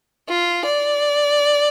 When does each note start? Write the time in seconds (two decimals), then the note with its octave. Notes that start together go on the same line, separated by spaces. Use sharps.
0.29 F4
0.65 D5